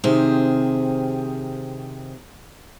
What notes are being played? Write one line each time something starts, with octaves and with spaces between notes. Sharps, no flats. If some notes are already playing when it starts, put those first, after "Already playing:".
C3 D#3 C4 G4 G#4